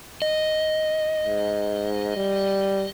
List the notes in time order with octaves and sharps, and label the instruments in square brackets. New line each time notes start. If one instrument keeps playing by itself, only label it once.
[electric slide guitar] D#5
[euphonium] G#2
G3